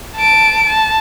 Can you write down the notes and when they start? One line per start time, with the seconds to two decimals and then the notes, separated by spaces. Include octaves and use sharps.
0.16 A5 D7
0.66 A5